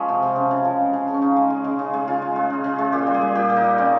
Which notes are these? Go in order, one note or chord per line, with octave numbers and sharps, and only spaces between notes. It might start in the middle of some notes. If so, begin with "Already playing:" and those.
Already playing: F3 G#3 C#4
C3
C3
C#3
C#3
F3
G#3
C#3
C#3
C#4
C#3 D#4
G#3
G#3
C#3
C#3
G#3
C#3 F4
G#3
G#3
C#3
C#3
G#3
A#2 G4
G3
G#4
G3
A#2 G4
A#2
D#4
G3
C#3 C4